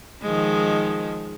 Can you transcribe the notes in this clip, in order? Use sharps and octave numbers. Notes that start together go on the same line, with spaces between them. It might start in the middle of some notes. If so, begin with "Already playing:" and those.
D#3 F3 G#3